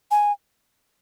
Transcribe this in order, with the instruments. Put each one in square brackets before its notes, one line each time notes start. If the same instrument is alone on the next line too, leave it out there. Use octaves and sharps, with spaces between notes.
[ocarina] G#5